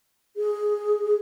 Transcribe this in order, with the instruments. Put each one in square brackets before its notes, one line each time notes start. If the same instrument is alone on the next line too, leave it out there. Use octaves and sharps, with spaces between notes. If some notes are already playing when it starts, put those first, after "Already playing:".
[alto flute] G#4